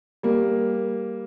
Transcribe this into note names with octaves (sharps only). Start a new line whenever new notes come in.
G3 A#3